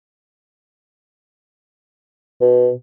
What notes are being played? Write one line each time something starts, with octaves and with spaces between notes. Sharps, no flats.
B2